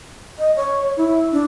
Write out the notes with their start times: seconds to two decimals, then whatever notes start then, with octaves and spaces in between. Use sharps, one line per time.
0.39 D#5
0.56 C#5
0.97 E4
1.32 D4